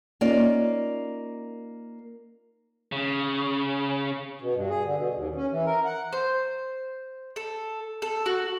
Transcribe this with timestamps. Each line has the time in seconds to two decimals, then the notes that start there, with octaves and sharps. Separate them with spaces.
0.21 A#3 C#4 D#4 F4 D5
2.92 C#3
4.41 B2
4.55 G2
4.70 G#4
4.84 D3
4.97 B2
5.14 D#2
5.35 C#4
5.50 E3
5.66 A#4
5.85 F#5
6.13 C5
7.36 A4
8.02 A4
8.26 F#4